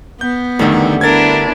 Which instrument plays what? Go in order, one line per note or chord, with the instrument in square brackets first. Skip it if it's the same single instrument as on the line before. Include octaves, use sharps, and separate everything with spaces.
[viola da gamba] B3 [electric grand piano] G6
[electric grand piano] E2 D#3 [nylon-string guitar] D3 G3 A3
[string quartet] B3 D4 E4 [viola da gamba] A#4 [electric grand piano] G#6 A6